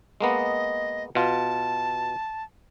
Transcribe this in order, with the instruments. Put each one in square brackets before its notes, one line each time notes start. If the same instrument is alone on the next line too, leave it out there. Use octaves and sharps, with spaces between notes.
[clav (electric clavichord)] G#3 A#3 B3 [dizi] D#5
[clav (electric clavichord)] B2 F4 [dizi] A5